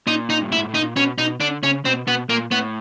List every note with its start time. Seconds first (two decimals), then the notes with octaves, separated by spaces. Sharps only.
0.07 A#2 D#4
0.30 D#4
0.41 G2
0.52 E4
0.55 G#2
0.69 A2
0.74 D#4
0.82 A#2
0.96 B2 C#4
1.18 B2 D#4
1.40 D3 D4
1.63 C#3 C#4
1.85 B2 C4
2.07 B2 B3
2.29 A#2 A#3
2.51 A2 B3